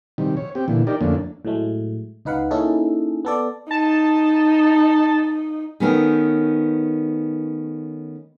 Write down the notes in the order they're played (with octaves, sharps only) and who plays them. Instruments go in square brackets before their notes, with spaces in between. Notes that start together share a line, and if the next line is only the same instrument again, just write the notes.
[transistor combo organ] C3 D#3 G3
C#5
C4 G4
A#2 D3 E3
D#4 G4 A#4 D5
F2 D3 A3 A#3 C#4 D4
[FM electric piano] A2 F#3 G#3 A3
C#2 D#4 B4 F5 F#5
A#3 C#4 D#4 E4 G#4 A4
B3 A4 D5
[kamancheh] D#4 [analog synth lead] A5
[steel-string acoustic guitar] D#3 A3 B3 C#4 D#4 A#4